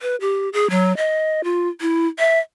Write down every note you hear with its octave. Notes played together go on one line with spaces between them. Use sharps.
B4
G4
G#4
F#3
D#5
F4
E4
E5